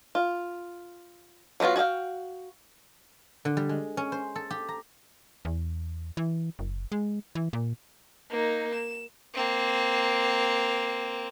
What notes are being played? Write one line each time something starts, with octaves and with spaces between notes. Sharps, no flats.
F4
F#3 B3 D#4 F4 F#4
F#4 G#4 D5 F5 G5
D3
G3
G#3
C#4
C5
A4
G4
A#5
E2
E3
F#1
G#3
E3
A#2
A#3 D#4
E7
A#3 C4